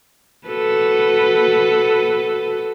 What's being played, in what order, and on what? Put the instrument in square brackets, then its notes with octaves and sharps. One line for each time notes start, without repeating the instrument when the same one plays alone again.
[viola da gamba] F#4 A4 B4